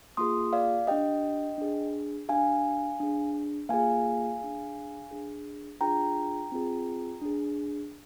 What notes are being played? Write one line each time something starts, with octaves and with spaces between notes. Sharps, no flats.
A#3 F4 G#4 C6 D#6
D5 F5
D4 G4 D#5 G5
D4 G#4
D4 G4 F5 G#5
D4 G#4
A#3 F4 G#4 F5 G#5
D4 G#4
D4 G#4
D4 F4 G#4 G5 A#5
C4 F4 G#4
D4 G#4